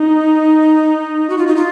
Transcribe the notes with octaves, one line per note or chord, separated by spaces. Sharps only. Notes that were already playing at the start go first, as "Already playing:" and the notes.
Already playing: D#4
F#4
F4
D#4
F4